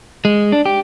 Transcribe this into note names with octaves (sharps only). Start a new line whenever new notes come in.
G#3
D4
G4